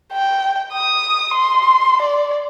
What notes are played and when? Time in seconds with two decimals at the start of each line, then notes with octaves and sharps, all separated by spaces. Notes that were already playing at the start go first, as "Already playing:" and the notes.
0.13 G5
0.73 D#6
1.34 C6
2.02 D5